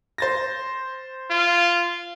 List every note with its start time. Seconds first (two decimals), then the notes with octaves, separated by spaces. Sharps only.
0.18 C5 A6 A#6
1.30 F4